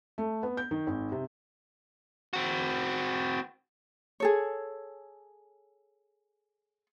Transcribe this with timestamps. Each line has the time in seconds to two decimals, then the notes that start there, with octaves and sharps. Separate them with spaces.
0.18 A3
0.43 B3
0.57 G6
0.71 D#3
0.87 G#1
1.12 C3
2.33 C4 F#4
4.20 G#4 A4 C#5